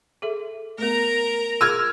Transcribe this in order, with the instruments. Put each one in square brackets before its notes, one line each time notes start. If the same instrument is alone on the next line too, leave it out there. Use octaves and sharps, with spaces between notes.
[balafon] G#4 A4 E5
[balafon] A3 B3 [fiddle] A#4 A#5
[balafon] G#4 [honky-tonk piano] E6 F6 G#6